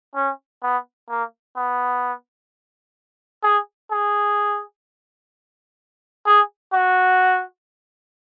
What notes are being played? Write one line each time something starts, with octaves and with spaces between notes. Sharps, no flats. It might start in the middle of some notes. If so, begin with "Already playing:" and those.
C#4
B3
A#3
B3
G#4
G#4
G#4
F#4